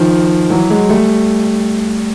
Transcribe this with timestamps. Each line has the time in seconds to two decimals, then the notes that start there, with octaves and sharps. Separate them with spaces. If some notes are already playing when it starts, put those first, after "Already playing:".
Already playing: D#3 F3
0.50 E3 F#3
0.70 F#3 G#3
0.89 G3 A3